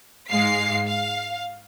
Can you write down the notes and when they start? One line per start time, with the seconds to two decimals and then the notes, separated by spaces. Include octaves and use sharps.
0.30 G#2 G#3 F5 C7
0.86 F5